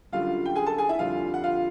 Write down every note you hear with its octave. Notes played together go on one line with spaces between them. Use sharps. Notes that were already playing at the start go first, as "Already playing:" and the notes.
F#2 D3 G3 F4 F5
G5
G#4 G#5
A4 A5
G#4 G#5
E4 E5
F2 D3 G3 F4 F5
F#5
F4 F5